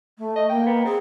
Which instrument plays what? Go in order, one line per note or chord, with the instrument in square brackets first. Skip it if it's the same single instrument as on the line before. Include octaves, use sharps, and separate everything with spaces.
[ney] A3
[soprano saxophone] D#5
[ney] A#3 [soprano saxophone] G5
[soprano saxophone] B3
[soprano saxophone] C4 [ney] G#4